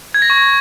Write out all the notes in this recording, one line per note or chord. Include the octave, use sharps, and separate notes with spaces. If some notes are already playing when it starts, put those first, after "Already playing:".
G#6
A#6
C#6